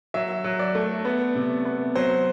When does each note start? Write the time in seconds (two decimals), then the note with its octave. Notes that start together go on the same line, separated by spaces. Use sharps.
0.14 F#3 E5
0.44 F#3
0.59 D5
0.75 A3
1.05 B3
1.35 C3
1.65 B3
1.95 F#3 C5